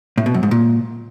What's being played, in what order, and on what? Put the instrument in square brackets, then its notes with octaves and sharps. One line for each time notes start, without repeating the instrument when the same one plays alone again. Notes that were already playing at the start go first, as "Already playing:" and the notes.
[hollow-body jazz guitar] A2
B2
F#2
G#2
A#2